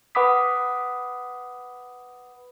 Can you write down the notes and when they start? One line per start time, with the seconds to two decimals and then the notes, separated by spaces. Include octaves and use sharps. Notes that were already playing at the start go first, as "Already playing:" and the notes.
0.15 B4 F#5 B5 D6 D#6 B6